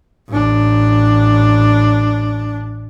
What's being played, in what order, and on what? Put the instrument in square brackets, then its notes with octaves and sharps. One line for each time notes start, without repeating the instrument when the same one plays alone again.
[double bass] A1 D4